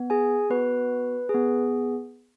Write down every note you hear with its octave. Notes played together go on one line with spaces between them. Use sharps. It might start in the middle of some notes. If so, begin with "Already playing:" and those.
Already playing: B3
G#4 G#5
B3 F#4 B4
G#4
B3